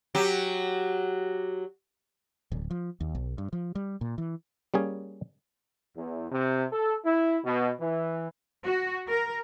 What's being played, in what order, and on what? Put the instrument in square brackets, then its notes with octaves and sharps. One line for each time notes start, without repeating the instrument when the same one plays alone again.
[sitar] F#3 G4
[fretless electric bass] D1
F3
D#2
B1
G2
F3
G3
A#2
E3
[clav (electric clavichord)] G3 A#3 C#4 G#4
[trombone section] E2
C3
A4
E4
B2
E3
[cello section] F#4
A#4